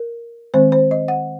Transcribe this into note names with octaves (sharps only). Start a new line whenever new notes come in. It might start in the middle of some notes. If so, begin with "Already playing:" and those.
Already playing: A#4
D#3 G#3 C4 C5
C5
D#5
F#5